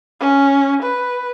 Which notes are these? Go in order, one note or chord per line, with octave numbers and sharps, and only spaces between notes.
C#4
B4